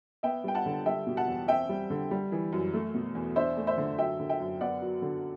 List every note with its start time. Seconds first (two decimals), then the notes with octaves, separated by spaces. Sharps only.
0.23 B3 E5 G5
0.44 G3 G5
0.55 F#5 A5
0.66 D3
0.86 G3 E5 G5
1.07 B2
1.17 F#5 A5
1.27 E2
1.48 C4 E5 G5
1.69 G3
1.90 D3
2.11 G3
2.32 E3
2.53 F#2
2.74 A3
2.94 B2
3.15 E2
3.36 D4 C5 E5
3.57 A3
3.67 C5 E5
3.78 D3
3.98 F#3 E5 G5
4.19 D3
4.29 E5 G5
4.40 F#2
4.61 B3 D5 F#5
4.82 F#3
5.02 D3